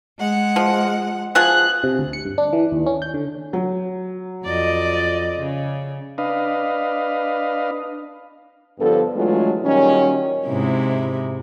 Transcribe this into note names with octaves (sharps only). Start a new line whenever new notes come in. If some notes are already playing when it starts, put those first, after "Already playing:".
G#3 F#5
F3
B2 F3 G#4 F#6
C3
D2
C#7
G2
D4
E3
D#2
C#4
G6
D3
F#3
F2 D5 D#5
C#3
D4 B4 D#5 F5
G2 D3 F3 B3 A4
E3 F#3 G#3 A3 D4 F4
A#2 D#3 F#3 G3 C#4
G#2 C3 E4